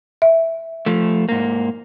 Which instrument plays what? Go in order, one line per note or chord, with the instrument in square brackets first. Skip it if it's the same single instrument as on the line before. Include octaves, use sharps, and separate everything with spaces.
[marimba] E5
[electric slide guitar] F3 A3
G#2 A#3